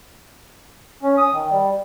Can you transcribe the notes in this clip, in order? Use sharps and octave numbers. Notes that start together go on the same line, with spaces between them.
C#4
D#6
D#3
G3